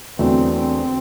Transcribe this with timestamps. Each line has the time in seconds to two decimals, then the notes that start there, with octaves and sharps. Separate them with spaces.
0.19 E2 D3 F#3 A3 C4 D4
0.56 C4